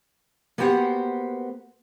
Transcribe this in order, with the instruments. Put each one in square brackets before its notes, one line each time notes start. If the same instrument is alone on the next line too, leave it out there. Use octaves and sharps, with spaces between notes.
[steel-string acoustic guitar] A#3 B3 F#4 G4 C5 F#5